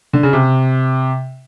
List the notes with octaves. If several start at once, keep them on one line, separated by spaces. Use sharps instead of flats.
D3
C#3
C3